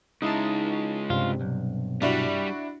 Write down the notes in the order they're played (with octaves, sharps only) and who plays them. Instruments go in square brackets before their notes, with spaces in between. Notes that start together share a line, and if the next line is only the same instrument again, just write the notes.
[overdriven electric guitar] C#3 G#3 [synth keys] D#4 E4 A5
[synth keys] G2 C3 [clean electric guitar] F4
[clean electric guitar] B1
[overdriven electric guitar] G3 [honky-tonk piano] D4 E4 F#4